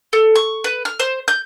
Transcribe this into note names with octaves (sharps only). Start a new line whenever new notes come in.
A4
C#6
B4
F6
C5
G6